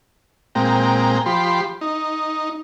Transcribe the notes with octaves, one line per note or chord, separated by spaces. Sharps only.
A#2 G#3 C4 G5 A#5
F3 G4 B5 C6
D#4